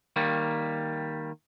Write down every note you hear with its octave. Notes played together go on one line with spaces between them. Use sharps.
D#3 G3 A#3